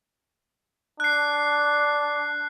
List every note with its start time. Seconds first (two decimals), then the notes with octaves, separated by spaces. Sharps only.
1.00 D4 F#6 C7